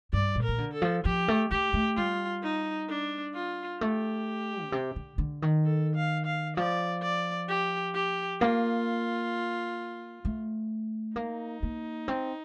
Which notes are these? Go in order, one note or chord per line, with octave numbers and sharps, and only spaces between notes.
G2 D5
A#2
A#4
D#3
D3
A4
F3
F3 G4
A3
A3 G4
A3
G3 F4
D#4
D4
F4
A3 G4
A#2
C3
D3
D3
D#3
A4
F5
F5
F3 D5
D5
G4
G4
A#3 F4
A3
A#3 D#4
A#3
C4